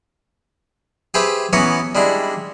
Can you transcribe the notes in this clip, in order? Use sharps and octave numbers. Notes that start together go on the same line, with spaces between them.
G4 G#4 B4 C5 E5 G5
E3 B3 C#4 F#5 A#5 D#6
G3 G#3 D4 E4